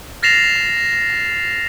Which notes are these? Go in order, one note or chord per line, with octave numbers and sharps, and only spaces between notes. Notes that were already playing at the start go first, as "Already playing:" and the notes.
F6 A6 A#6 C7 E7 F7